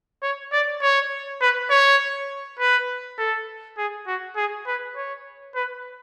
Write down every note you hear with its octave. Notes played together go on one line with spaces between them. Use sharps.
C#5
D5
C#5
B4
C#5
B4
A4
G#4
F#4
G#4
B4
C#5
B4